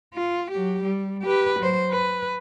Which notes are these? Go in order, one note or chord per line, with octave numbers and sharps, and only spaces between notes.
F4
F#3 G4
G3
G4 B4
F#3 C5
B4